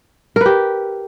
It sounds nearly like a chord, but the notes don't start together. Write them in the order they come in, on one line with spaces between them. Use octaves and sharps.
A#4 B4 G4